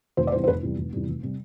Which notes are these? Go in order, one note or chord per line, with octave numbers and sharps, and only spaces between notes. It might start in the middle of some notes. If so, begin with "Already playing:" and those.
F1 C5
D5
E2 C3 G3 C5
C5
F1 B4
E2 C3 G3
F1
E2 C3 G3
F1
C3 G3